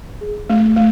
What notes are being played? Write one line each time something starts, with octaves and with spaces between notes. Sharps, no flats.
G#4
A3
A3